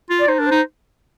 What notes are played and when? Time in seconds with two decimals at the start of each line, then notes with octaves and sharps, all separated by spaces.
0.10 F4
0.19 D5
0.27 D#4 C5
0.39 D4 A#4
0.46 C5
0.51 D#4